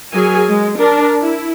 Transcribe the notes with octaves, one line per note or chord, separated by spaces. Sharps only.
F#3 G#4 A#4 G#5
G#3
D4 A#4
E4